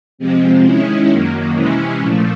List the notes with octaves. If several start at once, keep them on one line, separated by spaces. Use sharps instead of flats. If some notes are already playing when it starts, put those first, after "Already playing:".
C3 F3 G#3 C4
D#3 G#3 C#4 E4
F#2 D#3 F#3 A#3
C3 E3 G#3 C#4 E4
A#2 F3 A3